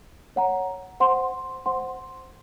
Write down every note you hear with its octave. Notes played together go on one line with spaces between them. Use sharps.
C#5 F#5 A#5
C5 F#5 C6
C5 F#5 C6